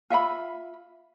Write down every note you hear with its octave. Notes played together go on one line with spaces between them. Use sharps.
F4 E5 F5 B5